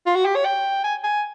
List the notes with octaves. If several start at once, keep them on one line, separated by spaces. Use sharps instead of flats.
F4
F#4
G4
C#5
G5
G#5
G#5